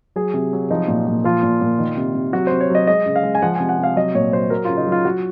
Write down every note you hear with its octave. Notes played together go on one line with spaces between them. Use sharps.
F#3 G#4
C3
F#3
F3 D#4
A#2
A#2
F3 F4
A#2
A#2
D#3
C3
C3
F#3 F#4
C3 C5
C#5
F#3 D#5
G#3 D#5
C#3
F5
G#3
G#5
F3 F#5
C3 G#5
F#5
C3
F5
F#3 D#5
A#2 C#5
F#3 C5
F#3 A#4
C#3 F4
D#4
F#3
F4
F#3 F#4